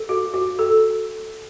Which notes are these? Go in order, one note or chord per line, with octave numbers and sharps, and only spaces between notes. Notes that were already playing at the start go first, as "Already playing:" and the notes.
Already playing: A4
F#4
F#4
A4